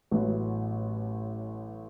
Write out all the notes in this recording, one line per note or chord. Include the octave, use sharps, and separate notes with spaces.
A1 A2 F#3 B3